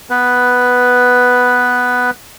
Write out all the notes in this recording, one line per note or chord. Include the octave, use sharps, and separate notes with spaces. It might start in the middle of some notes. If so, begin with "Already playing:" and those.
B3 B4